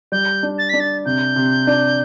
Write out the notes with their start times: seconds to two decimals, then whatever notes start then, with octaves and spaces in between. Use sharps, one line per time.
0.12 G3 G6
0.43 D4
0.58 A6
0.69 D4 B6
0.80 A6
1.05 C3 G6
1.36 C3
1.67 D4